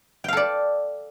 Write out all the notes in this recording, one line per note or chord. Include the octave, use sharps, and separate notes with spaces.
A4 D5 F5 G5